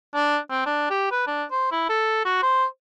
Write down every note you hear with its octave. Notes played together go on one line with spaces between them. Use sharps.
D4
C4
D4
G4
B4
D4
C5
E4
A4
F#4
C5